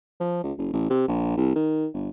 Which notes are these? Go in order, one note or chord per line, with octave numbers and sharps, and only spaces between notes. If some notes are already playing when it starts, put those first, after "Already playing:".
F3
C#2
F#1
A1
C3
A#1
C2
D#3
G1